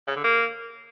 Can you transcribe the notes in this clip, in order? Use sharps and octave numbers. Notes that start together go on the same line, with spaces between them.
C#3
D3
A#3